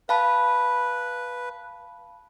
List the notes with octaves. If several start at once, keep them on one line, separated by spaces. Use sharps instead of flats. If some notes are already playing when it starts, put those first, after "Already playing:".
B4 F5 A5 B5